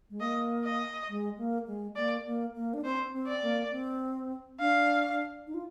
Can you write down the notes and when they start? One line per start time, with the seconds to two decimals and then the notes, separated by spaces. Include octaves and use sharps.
0.10 G#3
0.20 A#3 D#5
0.65 D#5
1.09 G#3
1.38 A#3
1.67 G#3
1.96 A#3 D5
2.25 A#3
2.54 A#3
2.74 D4
2.84 C4 C5
3.13 C4
3.27 D5
3.42 A#3
3.71 C4
4.60 D4 F5
5.47 D#4
5.54 F4